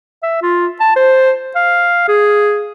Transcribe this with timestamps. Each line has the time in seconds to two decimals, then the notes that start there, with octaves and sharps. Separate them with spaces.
0.23 E5
0.42 F4
0.80 A5
0.96 C5
1.55 F5
2.08 G#4